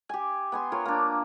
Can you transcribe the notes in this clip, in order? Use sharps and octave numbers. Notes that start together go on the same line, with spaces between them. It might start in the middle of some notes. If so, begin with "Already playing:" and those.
G4 G#5
B3 G#5 C6
F4 A#4 C#5
A#3 D4